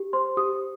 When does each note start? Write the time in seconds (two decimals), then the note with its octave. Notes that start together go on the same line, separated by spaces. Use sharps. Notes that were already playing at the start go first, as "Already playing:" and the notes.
Already playing: G4
0.13 C5 C6
0.37 G4 D#6